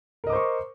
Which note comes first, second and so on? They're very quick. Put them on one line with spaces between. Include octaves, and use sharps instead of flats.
A#4 D#5 D6 C5 C#6